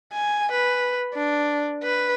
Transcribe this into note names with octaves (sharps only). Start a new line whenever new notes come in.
G#5
B4
D4
B4